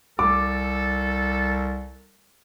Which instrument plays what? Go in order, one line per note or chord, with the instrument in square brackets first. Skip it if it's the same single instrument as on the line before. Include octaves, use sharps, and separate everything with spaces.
[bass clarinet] C2 [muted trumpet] A4 [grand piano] D6